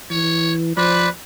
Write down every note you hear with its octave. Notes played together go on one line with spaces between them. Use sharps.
E3 C#5
F3 B4 C5 D5 B5